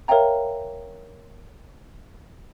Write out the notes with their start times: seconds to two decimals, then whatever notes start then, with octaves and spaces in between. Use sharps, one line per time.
0.08 A#4 C#5 E5 F5 G5 A#5